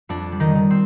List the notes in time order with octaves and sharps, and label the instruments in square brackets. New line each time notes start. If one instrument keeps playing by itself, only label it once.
[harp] F2 D4
G3
D#3 D#4
D#3
C4